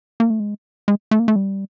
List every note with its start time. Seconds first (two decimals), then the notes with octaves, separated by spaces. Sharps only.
0.20 A#3
0.30 A3
0.40 G#3
0.88 G#3
1.11 A3
1.19 A#3
1.28 A3
1.36 G3